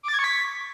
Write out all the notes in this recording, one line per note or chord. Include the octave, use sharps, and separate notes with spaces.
D6
A6
G#6
C#6
B6